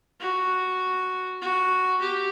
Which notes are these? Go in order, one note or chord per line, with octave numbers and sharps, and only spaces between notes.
F#4
F#4
G4